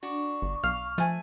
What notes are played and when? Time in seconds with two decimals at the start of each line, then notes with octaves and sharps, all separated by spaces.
0.03 D4 F#4 C#6
0.42 G1
0.64 B1 F5 F6
0.98 F3 A3 G#5